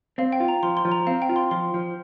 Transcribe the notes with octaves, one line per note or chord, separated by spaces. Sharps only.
C4 F5
G5
F4
A#5
F3 C6
C6
F3
A#5
C4 F5
G5
F4
C6
F3 C6
F3